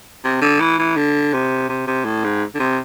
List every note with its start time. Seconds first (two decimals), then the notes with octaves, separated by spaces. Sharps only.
0.25 C3
0.42 D3
0.60 E3
0.78 E3
0.97 D3
1.33 C3
1.69 C3
1.87 C3
2.05 A2
2.24 G#2
2.55 D3
2.59 C3